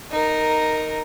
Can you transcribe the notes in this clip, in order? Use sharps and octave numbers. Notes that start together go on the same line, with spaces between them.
D#4 A#4